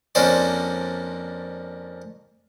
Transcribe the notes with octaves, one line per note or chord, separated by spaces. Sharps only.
F2 A#3 C#4 D4 C5 D5